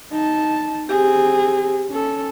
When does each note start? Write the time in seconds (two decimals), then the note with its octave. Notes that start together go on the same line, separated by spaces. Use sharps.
0.11 D#4 A5
0.89 C4 G4 G#4
1.89 C#4 A4